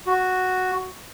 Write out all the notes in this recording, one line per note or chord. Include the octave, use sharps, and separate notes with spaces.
F#4